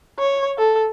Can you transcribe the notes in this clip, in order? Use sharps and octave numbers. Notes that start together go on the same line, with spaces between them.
C#5
A4